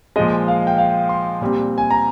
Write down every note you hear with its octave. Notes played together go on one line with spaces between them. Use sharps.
A#2 F3 G#3 D#5
F5
G5
F5
C6
A#2 G3 C4
G#5
A#5